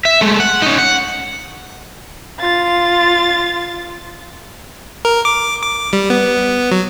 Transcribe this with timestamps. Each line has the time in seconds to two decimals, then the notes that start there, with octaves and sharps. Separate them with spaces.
0.05 E5
0.21 G#3 A3
0.40 F#5
0.62 C#4 D#4
0.78 F#5
2.40 F4 A6
5.05 A#4
5.25 D6
5.63 D6
5.93 G3
6.10 B3
6.72 F#3